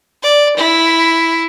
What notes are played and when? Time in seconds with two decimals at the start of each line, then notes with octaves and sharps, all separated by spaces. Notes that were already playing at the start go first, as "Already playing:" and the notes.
0.23 D5
0.57 E4